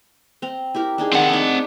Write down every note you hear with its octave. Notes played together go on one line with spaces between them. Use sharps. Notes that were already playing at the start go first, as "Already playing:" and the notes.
C4 A#5
E4 G4 A#4
D4 D#4 G#4
D#3 C4 C#5 E5 F#5
D4 D#4